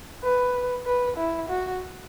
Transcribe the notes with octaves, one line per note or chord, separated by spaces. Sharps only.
B4
B4
E4
F#4